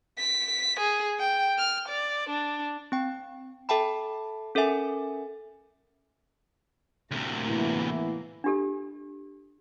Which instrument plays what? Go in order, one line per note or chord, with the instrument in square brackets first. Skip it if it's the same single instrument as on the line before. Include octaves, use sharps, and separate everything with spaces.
[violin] B6
G#4
G5
F6
D5
D4
[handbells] C4 G5
A4 E5 G5 A5 B5
C#4 A4 A#4 E5 G#5
[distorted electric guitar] D2 C3 [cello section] A2 A#3
[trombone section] E3 B3 E4
[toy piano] D4 F4 G4 A4